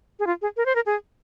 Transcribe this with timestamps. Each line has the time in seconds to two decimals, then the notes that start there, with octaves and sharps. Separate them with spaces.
0.19 G#4
0.27 F4
0.42 G#4
0.57 A#4
0.66 C5
0.75 A#4
0.86 G#4